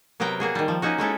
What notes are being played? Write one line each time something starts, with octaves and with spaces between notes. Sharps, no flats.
C3 F#3 B3 A#4 G5 A#5
A#3 F#4 G#4
D#3 G3
F3
A#3 C#4 D#4 F#4
G#3 C#4 E4 A4